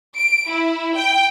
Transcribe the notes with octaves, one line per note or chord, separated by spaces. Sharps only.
D7
E4
G5